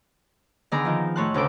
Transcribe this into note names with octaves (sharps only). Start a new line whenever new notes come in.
D3 D#3 B3 G#4 D5 A#5
D#3 F3
A2 C#5 A5 C6 F#6
D2 C#3 C#4 A4 D6